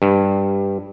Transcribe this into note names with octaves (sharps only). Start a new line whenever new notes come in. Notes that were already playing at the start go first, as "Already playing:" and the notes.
G2